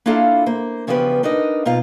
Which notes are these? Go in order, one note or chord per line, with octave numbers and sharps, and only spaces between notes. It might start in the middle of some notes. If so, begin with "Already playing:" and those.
A#3 D4 E4 F4 A4 F5
A#3 C5
E2 C#3 F3 B3 G4 B4
D4 D#4 A#4 B4 D#5
B2 D#4 F4 F5